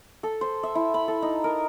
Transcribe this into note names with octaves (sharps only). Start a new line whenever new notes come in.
A4
C5
E5
E4
B5
A4
D#4
A#4